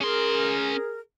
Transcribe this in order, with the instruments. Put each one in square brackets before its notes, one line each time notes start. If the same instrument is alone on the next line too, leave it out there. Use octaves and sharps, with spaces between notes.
[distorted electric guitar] C#4 C6 [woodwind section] G#4 A#4